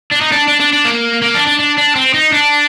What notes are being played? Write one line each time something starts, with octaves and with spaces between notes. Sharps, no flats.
D4
D#4
D4
D4
D4
D4
A#3
A#3
D4
D4
D4
D4
C4
D#4
D4